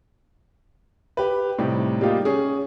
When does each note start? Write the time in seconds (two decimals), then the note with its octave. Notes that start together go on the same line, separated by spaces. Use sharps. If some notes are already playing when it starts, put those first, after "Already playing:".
1.17 G4 B4
1.58 A2 C3 G3 D#4 G4
2.01 G3 G#3 A#3 D#4 F4 G4
2.25 C#4 G#4